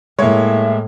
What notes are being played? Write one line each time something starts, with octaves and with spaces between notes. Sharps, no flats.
A2 G#3 A#3 E4 C#5 E5